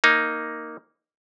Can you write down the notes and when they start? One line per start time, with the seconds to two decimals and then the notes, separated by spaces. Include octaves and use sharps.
0.04 A#3 D#4